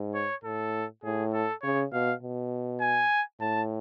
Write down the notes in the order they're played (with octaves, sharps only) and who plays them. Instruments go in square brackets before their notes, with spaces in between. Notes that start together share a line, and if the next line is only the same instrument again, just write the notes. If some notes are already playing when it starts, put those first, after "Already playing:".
Already playing: [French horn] G#2
[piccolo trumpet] C#5
[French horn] A2 [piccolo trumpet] A4
[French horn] A2 [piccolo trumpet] G#4
[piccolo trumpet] A4
[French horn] C#3 [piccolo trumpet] C#5
[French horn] B2 [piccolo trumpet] F5
[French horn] B2
[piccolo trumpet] G#5
[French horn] A2 [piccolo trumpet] A5